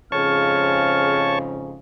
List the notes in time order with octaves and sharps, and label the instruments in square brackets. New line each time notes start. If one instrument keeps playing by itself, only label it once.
[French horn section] F2 G#2 C#3 [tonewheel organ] C#5 A5 C#6 [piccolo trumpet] F6